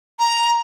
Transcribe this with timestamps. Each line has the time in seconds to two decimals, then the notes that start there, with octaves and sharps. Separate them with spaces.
0.19 A#5